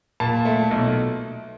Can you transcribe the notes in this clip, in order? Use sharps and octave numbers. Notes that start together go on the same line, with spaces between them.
A#2 A5
A3
B1